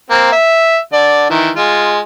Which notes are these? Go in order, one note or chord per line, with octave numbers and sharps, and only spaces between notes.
A#3 C4
E5
D3 D5
D#3 E3
G#3 F4